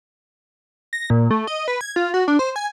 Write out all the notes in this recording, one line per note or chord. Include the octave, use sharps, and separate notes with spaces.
A#6
A#2
A3
D#5
B4
G#6
F4
F#4
D4
C5
G#5